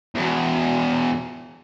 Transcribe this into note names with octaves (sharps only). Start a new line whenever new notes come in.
E2 B2